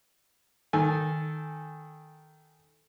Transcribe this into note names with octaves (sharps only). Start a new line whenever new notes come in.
D#3 A4 G#5